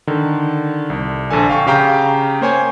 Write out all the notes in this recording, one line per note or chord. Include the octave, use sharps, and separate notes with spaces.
D3 D#3
C2
A#1 D3 A4 G#5
F5 G5 C#6
C#3 G4 F5 G5 A#5 G6
A#3 C5 C#5 G#5